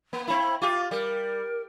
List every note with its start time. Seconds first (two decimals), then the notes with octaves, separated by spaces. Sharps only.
0.13 A#3
0.28 C4 E4 B5
0.62 F4 G4 D6
0.91 G3 A#4